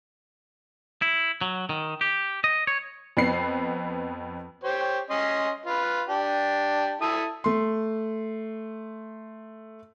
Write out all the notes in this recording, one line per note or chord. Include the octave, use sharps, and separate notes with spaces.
E4
F#3
D#3
G4
D#5
C#5
F2 B3 C7
G4 C5 C#5
C#4 D#5 C6
F4 B4
D4 G4
E4 A4 D#6
A3 C6